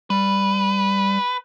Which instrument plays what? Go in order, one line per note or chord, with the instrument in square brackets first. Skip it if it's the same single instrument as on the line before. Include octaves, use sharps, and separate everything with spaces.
[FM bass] G3 [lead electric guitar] B4